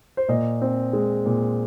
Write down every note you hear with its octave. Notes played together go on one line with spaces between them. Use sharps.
C5
A#2 D#5
C4
G#3
A#2